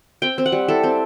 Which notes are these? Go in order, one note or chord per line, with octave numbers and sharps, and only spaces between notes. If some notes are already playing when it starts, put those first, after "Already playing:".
C4 G5
C4
F#5
G3
E4 A4
C4